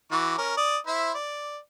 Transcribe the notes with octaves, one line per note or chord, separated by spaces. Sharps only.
E3 F#4 D6
C#4 A#4
D5 D#6
E4 C5 E5
D5